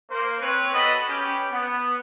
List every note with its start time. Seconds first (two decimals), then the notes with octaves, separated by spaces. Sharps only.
0.10 A#3 C5
0.40 C4 B4 C#5
0.73 B3 F#4 A4 D#5 A5 B5
1.08 C#4 G4 B4
1.51 B3